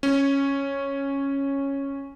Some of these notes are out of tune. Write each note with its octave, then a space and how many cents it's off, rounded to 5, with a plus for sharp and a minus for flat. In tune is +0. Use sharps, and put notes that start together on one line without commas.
C#4 -5